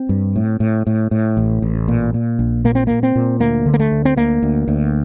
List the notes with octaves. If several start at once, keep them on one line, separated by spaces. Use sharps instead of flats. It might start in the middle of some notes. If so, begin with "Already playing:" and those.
Already playing: C4
G2
A2
A2
A2
A2
A1
A1
A#2
A#2
A#1
A#2 A#3
C4
A#2 A#3
C4
A#2
D2 A#3
D3
A#3
A3
D2
C4
D2 A#3
D2
D2